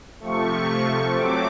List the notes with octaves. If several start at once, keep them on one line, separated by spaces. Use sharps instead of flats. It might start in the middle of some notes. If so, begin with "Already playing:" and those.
C3 F3 A3 C#6
F#3 A3 C4 D6